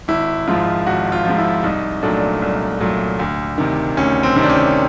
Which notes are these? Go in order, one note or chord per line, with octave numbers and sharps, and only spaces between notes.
G#1 E4
G#2 F3 F4
G#1 F#4
F4
G#2 F3
E4
C2 D#4
A#2 F#3 A3 D4
C2
A#2 F#3 A3
D2
C3 D#3
D2 C#4
C4
C3 D#3
D4
C#4